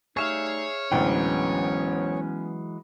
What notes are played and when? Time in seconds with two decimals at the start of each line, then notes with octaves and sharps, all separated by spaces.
0.17 G3 A3 D#4 G#4 C#5 E5 F5
0.92 A1 D2 E3 F#3 G#3 B3 C#4 G5